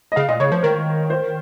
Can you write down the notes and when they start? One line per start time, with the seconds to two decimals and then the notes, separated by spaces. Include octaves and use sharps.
0.12 D#5
0.16 C#3 F5
0.29 A#2 D#5
0.40 C#3 C#5
0.52 F3 C5
0.63 D#3 A#4
1.10 C5